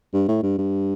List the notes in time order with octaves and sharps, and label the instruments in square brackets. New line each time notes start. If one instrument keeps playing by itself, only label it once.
[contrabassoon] G2
A2
G2
G2